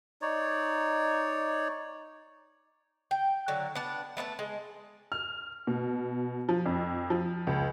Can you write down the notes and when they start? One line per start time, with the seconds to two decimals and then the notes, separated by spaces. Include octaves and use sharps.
0.22 D#4 C#5 D5
3.11 G5
3.48 D3 F#3
3.75 B3 D4 A5
4.17 A3 B3 D5 A5
4.39 G#3
5.12 F6
5.67 B2
6.49 F3
6.66 F2
7.10 F3
7.47 C#2